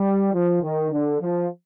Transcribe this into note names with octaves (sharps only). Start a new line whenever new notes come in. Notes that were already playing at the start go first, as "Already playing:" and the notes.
Already playing: G3
F3
D#3
D3
F3